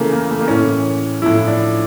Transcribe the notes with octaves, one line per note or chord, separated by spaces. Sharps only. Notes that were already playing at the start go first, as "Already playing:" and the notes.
Already playing: C#3 E3 A3 A#3
A#3
A3
A#3
A2 E3 C#4
A2 F3 E4
D4